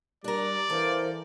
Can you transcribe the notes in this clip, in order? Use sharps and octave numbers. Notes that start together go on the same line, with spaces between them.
G3 D4 A#4 D5
E3 A4 A#4 C5 F5